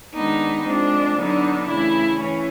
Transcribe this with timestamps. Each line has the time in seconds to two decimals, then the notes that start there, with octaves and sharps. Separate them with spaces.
0.14 D#3 G#3 B3 D4 D#4
0.66 F3 G#3 C4 D4
1.17 D3 F#3 B3 D4 D#4
1.68 C#3 E3 A3 E4
2.20 E3 C#4